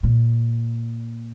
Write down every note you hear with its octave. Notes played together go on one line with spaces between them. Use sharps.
A#2